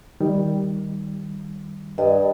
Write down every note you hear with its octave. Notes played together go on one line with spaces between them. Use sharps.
D#3 G3
G2 D#5